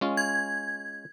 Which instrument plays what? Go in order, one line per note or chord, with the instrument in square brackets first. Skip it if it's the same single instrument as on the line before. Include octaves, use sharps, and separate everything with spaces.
[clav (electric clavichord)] G#3 C#4 F4
[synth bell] G#6